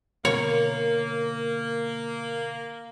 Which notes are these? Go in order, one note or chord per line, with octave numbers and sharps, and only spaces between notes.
B2 D3 A#3 A#4 C#5